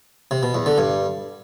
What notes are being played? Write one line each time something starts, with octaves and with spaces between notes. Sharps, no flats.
C3
B2
E2
D3
G2